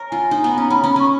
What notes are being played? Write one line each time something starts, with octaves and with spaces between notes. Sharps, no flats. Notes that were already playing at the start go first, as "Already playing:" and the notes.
Already playing: A#4 C#5
F4 G#5
D#4
B3
C#4 A#5
C#4 B5
A#5
C#4
B5
C#4 C#6